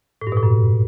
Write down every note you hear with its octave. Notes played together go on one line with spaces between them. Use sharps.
A2
G2
B2
A2
F#2